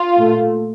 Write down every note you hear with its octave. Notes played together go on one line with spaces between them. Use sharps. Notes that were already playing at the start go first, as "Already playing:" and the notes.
Already playing: F4
A#2 A3